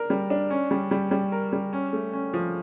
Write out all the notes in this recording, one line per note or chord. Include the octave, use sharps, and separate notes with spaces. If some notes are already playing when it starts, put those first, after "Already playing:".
Already playing: D4 A#4
G3
D4
C#4
G3
G3
G3
A#4
G3
C#4
A3
C#4
F3